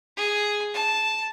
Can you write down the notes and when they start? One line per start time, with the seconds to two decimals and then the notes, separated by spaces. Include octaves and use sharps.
0.17 G#4
0.74 A5